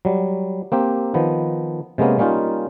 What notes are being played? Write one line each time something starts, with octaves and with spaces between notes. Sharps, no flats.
F#3 G3
A#3 C4 G4
D#3 F3 B3
C3 G#3 A#3 B3 C#4
G3 A#3 C#4 D#4 F4